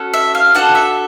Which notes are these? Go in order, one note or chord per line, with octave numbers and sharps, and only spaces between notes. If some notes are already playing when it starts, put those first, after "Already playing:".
Already playing: C#4 F#4 A4
E5
F5
D4 F#4 A4 F#5
E5